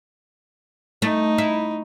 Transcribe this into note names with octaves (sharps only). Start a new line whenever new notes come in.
A3 D#4
E4